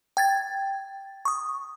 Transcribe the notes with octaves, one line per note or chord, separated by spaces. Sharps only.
G5 G#6 A6
C#6 D#6